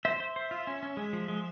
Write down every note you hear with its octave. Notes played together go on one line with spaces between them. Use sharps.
C5 E5
C5
C5
F4
C#4
C#4
G#3
F3
G#3